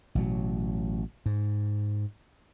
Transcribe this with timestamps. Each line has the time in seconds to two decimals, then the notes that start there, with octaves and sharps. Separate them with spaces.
0.15 A1 B2 F#3
1.26 G#2